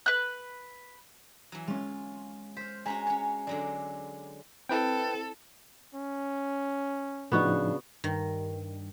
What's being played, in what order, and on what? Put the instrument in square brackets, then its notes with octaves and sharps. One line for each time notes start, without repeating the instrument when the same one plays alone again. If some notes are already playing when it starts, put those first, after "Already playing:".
[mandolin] B4 F#6
[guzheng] E3 F#3
[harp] G#3 C#4 [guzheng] F4
[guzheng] C5 [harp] F6 B6
[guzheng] G#3 C#4 F#4 [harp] G#5 A#5 B6
[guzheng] C#4 C#5
[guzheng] D3 F#3 G#3 [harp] D5
[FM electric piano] C4 E4 [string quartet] A4 [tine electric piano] B4 G5
[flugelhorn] C#4
[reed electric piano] A2 F3 D#4 [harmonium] C#3 D4 [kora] B3 F#4
[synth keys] G2 [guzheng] D#3